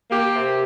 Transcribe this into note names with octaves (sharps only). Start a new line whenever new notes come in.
A#3 G4
C3